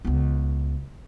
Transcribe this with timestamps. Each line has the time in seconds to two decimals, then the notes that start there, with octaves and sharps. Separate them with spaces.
0.05 C#2 B3